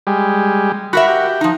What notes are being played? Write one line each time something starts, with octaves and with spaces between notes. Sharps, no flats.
G3 G#3
F#4 A#4 E5 F#5 B5
G4
F3 D#4